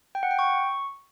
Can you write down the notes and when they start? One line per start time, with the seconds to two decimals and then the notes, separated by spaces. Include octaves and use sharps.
0.15 G5
0.23 F#5
0.31 G5
0.39 C#6